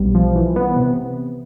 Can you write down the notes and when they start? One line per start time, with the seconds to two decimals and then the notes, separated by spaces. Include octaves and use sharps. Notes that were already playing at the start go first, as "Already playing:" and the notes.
Already playing: B1 G3
0.15 F3
0.35 E3
0.56 B3
0.76 C3